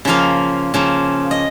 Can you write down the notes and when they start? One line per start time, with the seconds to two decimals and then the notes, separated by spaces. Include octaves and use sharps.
0.05 C#3 F3 A#3 F5
0.74 C#3 F3 A#3
1.31 D#5